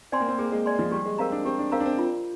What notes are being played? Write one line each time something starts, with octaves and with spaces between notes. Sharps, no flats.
C4 D5 G#5 C6
A#3
C4
A#3 G#4
G#3
D5 G#5 C6
F3
G3 G4
G#3
C4 A#4 F5 A#5
D4
C4 G4
D4
C4 A#4 F5 A#5
D4
C4
F4